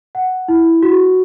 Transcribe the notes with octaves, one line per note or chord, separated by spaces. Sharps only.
F#5
E4
F#4